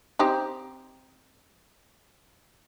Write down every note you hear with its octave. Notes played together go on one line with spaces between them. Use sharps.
C4 D#4 G4